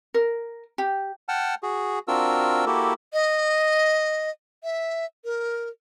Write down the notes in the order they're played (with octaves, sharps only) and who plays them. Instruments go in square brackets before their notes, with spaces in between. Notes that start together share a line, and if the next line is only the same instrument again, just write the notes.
[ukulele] A#4
G4
[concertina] F#5 G5 A5 F6
F#4 G#4
C4 D4 F4 F#4 A#4 E6
A#3 E4 F#4 G4 A4
[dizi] D#5
E5
A#4